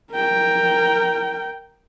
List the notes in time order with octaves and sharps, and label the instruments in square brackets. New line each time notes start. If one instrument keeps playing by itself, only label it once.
[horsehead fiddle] A#4 G5